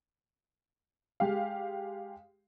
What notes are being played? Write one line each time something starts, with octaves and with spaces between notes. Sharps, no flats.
G#3 G4 F5